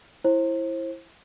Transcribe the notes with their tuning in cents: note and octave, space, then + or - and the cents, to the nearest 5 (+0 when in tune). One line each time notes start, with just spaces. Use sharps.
E4 +5 C5 +30